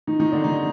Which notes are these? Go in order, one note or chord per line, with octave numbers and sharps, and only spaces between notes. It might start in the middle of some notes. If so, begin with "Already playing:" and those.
D#3 D#4
D#3 D#4
D3 D4
D#3 D#4